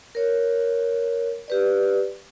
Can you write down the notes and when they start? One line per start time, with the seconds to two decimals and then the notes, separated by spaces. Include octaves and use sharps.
0.15 A#4 C#5
1.48 G4 B4 D5